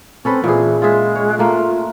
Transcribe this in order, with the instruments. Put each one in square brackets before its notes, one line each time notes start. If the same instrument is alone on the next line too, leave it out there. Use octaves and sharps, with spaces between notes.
[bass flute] C4 [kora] C#4 A4 B4
[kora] A#2 G#4 [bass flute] E3
[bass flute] G#3 [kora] F4 G#4 E5
[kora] C#5
[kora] A3 A#3 [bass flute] F4